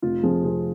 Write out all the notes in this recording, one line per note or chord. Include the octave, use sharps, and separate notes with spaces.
F1 F4
F2 F3 G#4
F1 G#4